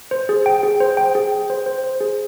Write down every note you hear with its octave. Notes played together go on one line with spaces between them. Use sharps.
C5
G#4
G5
G#4
C5
G5
G#4
G5
C5
C5
C5
G#4